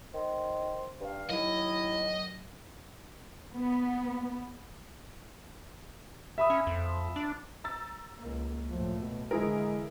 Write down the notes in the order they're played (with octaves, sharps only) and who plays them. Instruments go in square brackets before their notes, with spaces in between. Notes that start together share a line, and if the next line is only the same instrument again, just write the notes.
[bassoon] D#3 [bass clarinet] C5
[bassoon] G2 [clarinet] F5
[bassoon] D#2 [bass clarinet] F#3 [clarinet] E4 [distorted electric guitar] D#5
[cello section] B3
[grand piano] E5 B5 D#6
[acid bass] C#4
F2
D4
[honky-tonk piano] A#5 E6 A6
[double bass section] C#2 A#3
[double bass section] F#2 A2 A3 [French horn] F3
[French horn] B2
[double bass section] D3 E3 [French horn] G#3 [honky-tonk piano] E4 G#4 A#4